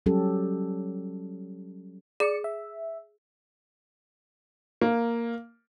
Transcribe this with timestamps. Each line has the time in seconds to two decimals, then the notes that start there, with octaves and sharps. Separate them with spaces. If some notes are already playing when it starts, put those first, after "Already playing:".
0.06 F#3 G3 C#4 G4 A4
2.20 G#4 D5 C#7
2.44 E5
4.82 A#3